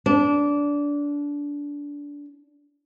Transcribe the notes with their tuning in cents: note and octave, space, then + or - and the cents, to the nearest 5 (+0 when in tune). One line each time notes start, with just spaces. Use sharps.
D4 -20